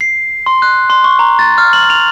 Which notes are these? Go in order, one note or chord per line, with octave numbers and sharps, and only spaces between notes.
C7
C6
F#6
C6
C#6
A#5
A6
F6
F#7
F7